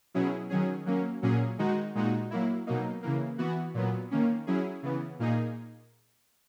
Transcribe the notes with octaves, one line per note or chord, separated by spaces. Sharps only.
B2 F#3 C#4 E4 G#4
D#3 F#3 C#4 G#4
F#3 A#3 C#4
A#2 F#3 A#3 C#4 G#4
D#3 G#3 D#4 F#4
A#2 G#3 D#4 F#4
F#3 A#3 E4
B2 F#3 A#3 D#4
C#3 E3 A#3
E3 B3 F#4
A#2 F#3 B3
D#3 A#3 C#4
F#3 C#4 E4 G#4
C#3 E3 B3
A#2 A#3 D#4 G#4